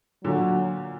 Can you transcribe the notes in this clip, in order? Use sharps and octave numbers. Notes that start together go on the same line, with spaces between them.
A#2 D3 F#3